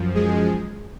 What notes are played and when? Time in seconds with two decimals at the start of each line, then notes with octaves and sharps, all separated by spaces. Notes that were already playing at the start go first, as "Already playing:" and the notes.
Already playing: F#2 F3
0.15 G#3 G#4